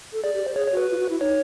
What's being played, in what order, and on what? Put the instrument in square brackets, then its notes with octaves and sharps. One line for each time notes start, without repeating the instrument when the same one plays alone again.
[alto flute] A4
[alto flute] G#4 [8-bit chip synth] D5
[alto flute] G4
C5
[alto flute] G#4 [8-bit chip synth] C#5
[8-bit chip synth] C#5
[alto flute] F#4 [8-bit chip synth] B4
[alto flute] F4
F#4
E4
[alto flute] D#4 [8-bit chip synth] C#5